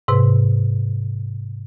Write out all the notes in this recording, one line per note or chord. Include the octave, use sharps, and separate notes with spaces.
G#2 C3 B4